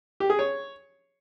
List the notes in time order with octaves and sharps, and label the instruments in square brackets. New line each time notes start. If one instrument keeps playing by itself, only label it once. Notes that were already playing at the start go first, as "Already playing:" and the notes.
[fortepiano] G4
G#4
C#5